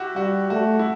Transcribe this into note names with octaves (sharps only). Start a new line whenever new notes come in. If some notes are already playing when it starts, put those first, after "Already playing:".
Already playing: E4 F#4 G4
G3 F#4
A3 F#4
E4